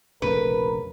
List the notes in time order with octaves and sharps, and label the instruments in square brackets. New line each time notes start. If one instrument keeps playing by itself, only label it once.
[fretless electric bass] F1 A#1 C#3 [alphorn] A#4 [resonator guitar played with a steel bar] B4